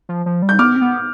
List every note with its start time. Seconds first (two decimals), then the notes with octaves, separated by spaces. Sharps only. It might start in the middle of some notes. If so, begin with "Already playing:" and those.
0.09 F3
0.26 F3
0.42 G3
0.49 G6
0.59 B3 D6 F6
0.76 C4
0.81 B3